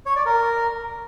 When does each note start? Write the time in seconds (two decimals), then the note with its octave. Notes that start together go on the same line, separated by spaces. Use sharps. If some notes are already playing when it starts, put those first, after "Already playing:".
0.06 C#5
0.16 D5
0.26 A#4